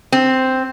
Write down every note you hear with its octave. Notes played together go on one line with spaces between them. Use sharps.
C4